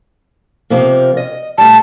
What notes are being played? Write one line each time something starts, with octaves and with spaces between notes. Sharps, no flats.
C3 F3 A#3
D#5
A2 G3 A5